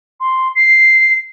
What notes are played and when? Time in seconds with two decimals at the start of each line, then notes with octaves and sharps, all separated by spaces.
0.20 C6
0.55 C7